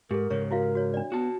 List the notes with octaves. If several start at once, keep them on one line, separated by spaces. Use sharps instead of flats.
G#2 G4 A4 A#4
G#2 C#3 C#5 C#6
E4 F#4 A#4 F5
F#4 C#5
D4 D5
B3 F#4 A5